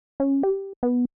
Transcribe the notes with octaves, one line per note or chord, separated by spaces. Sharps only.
C#4
G4
B3